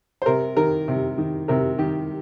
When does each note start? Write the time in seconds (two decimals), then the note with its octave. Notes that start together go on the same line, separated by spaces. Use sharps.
0.22 C5
0.26 C3 A#4
0.57 D#3 A#4
0.88 C3
1.18 D#3
1.48 C3 A#4
1.78 D#3 G4